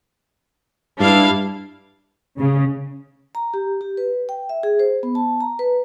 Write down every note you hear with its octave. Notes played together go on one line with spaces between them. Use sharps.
G2 D4 E4 F5
C#3
A#5
G4
G4
B4
G5
E5
G#4
C5
B3
A5
A#5
B4